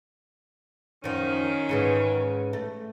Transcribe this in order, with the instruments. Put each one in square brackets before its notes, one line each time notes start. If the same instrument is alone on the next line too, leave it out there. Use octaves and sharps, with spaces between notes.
[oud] F#2 F3 [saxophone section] D#3 C#4
[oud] G#2 C#3 E3
A3